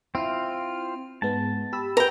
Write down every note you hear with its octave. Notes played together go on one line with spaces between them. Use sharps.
C4 E4 F4 F6
G#2 G#3 B3 A5
G4 B5 E6
B4 G5 A#5